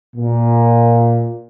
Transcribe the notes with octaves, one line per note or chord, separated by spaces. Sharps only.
A#2